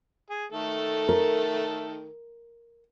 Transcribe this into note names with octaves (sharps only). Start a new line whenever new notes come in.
G#4
D#3 A3 A4
A#4